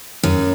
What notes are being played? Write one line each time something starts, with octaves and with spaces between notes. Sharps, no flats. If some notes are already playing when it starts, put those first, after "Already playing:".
F#2